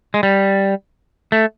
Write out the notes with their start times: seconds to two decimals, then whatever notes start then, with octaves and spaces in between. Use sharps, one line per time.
0.14 G#3
0.23 G3
1.32 A3